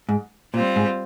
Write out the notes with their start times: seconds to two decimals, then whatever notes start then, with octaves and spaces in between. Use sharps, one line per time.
0.09 G#2
0.54 A#2 G3 C4 F4 C5
0.76 G#2